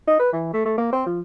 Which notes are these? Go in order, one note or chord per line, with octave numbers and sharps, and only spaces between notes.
D#4
B4
E3
A3
A3
A#3
C4
F3